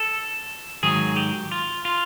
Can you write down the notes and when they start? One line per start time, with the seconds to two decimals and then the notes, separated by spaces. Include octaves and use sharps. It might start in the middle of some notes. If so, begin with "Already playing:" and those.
Already playing: A4
0.83 G#2 D#3 F#3 G#4
1.16 G4
1.51 F4
1.85 F4